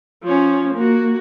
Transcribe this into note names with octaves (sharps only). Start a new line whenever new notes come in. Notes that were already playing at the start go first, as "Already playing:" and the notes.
F3 C#4
A#3 F#4